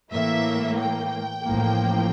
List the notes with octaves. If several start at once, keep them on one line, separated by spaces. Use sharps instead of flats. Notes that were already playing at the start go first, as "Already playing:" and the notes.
A2 E3 A#3 E5
G5
A1 A2 F3 A#3